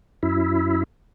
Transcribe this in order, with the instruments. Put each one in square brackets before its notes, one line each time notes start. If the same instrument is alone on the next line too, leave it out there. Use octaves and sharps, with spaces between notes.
[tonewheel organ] F#2 E4